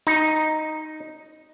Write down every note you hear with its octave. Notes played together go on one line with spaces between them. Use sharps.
D#4